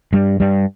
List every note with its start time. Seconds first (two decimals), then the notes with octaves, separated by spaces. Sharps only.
0.13 G2 G3
0.40 G2 G3